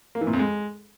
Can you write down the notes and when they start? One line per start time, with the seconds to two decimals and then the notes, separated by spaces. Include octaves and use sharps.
0.15 A#3
0.21 E3
0.27 A#2
0.33 F2
0.39 G#3